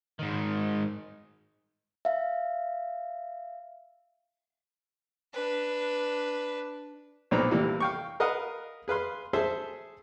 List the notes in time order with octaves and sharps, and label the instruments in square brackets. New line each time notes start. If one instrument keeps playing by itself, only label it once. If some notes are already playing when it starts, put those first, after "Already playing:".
[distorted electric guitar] G#2 D#3
[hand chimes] E5 F5
[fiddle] D4 B4
[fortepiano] B1 A#2 B3 C4 A#5
C3 E3 G3 A#3
F5 G5 C#6
A#4 B4 D#5 F5 F#5
G#4 B4 F5 C6
G#4 A4 C5 E5 C6